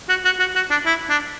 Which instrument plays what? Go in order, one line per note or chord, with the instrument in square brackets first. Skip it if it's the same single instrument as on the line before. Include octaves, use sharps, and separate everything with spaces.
[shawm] F#4
F#4
F#4
F#4
D4
E4
D4